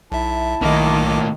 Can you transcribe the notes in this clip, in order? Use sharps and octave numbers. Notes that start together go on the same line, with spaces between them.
B1 E4 E5 A5
B1 A2 D#3 A#3 D#5 D6